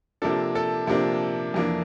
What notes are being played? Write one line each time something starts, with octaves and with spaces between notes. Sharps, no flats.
C3 F3 A#3 D4 A4
A4
C3 F3 A#3 D4
F2 E3 A#3 D4